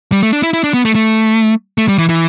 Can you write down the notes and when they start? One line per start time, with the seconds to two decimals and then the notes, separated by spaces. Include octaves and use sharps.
0.12 G3
0.23 A3
0.33 D4
0.43 E4
0.53 E4
0.64 D4
0.74 B3
0.85 A3
0.95 A3
1.78 A3
1.88 G3
1.98 E3
2.09 E3